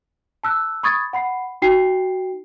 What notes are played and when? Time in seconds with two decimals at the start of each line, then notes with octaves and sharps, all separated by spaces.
0.43 A5 E6 F#6
0.83 B5 C#6 D#6 G#6 A6
1.13 F#5 B5 C7
1.62 D#4 F#4 G5 C7